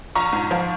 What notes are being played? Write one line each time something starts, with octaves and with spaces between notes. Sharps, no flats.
A#1 A#5 C#6
G#2
F3